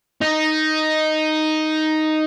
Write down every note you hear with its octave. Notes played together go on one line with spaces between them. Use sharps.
D#4